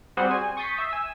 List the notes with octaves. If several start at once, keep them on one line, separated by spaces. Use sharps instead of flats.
G3 C4 F#4 G#4 C5
G#5
C#6 D#6 G6 A6 B6 C7
E5
G#5 E6